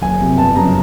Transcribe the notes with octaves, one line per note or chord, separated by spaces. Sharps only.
F#1 G#5
F2 C3
G1 A5
F#2 C#3 A#5